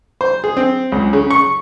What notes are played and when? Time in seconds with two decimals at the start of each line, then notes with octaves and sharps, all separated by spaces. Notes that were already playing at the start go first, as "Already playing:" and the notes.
0.21 C5
0.44 G#4
0.57 C4
0.92 C#2
1.13 C#3
1.31 C#6